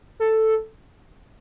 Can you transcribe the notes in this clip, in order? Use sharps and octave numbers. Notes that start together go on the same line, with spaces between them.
A4